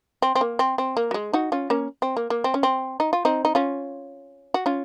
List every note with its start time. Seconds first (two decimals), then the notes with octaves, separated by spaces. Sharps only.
0.22 C4
0.35 C4
0.41 A#3
0.59 C4
0.78 C4
0.97 A#3
1.11 F#3
1.14 G#3
1.33 D#4 F#4
1.52 C#4 F4
1.70 A#3 C#4
2.02 C4
2.17 A#3
2.30 A#3
2.44 C4
2.54 C#4
2.63 C4
3.00 D#4
3.13 F4
3.25 C4 D#4
3.45 D#4
3.55 C#4 F4
4.54 F#4
4.66 C#4 F4